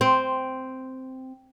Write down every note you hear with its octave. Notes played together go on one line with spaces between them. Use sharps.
C4